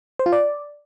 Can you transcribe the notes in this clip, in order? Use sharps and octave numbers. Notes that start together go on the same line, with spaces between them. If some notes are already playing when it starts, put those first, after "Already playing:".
C5
F4
D5